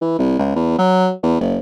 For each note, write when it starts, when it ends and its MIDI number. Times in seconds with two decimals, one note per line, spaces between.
0.02 0.16 52
0.19 0.37 36
0.39 0.51 37
0.55 0.74 40
0.79 1.12 54
1.23 1.40 40
1.41 1.59 30